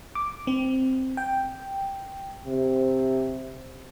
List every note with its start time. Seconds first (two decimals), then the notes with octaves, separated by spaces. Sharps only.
0.15 D6
0.47 C4
1.17 G5
2.45 C3